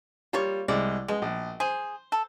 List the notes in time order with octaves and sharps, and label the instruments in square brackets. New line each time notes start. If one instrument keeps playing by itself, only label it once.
[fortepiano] G3 [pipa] A#3 F4 C#5
[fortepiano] C2 G#3 [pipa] D5
[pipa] B2 [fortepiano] G#3
[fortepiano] A#1
[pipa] G#4 [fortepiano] C5
[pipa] A4